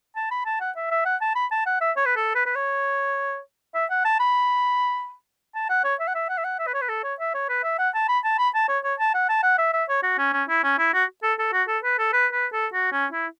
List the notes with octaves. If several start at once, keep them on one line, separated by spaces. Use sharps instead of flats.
A5
B5
A5
F#5
E5
E5
F#5
A5
B5
A5
F#5
E5
C#5
B4
A4
B4
B4
C#5
E5
F#5
A5
B5
A5
F#5
C#5
E5
F#5
E5
F#5
E5
F#5
E5
B4
C#5
B4
A4
C#5
E5
C#5
B4
E5
F#5
A5
B5
A5
B5
A5
C#5
C#5
A5
F#5
A5
F#5
E5
E5
C#5
F#4
C#4
C#4
E4
C#4
E4
F#4
A4
A4
F#4
A4
B4
A4
B4
B4
A4
F#4
C#4
E4